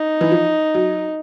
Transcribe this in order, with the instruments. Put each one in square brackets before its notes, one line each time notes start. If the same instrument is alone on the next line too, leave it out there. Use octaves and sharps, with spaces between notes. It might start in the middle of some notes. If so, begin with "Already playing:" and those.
Already playing: [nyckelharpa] D#4
[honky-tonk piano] E3
F3
F#3